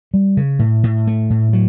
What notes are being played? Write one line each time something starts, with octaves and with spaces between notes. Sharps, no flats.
G3
C#3
A2
A2
A3
A2
F#3